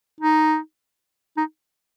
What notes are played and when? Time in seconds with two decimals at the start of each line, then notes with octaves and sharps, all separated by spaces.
0.21 D#4
1.37 D#4